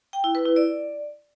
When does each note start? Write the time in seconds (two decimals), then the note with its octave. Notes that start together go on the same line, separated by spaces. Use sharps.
0.13 G5
0.24 E4
0.35 B4
0.46 E4
0.56 D5